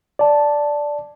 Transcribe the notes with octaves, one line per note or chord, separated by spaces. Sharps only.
D5 A5